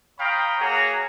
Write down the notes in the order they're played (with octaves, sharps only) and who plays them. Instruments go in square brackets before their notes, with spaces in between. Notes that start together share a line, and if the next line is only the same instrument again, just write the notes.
[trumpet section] C#5 F5 G5 A#5 B5 D#6
A#3 F#4 G#4 C#5 F#5 A#5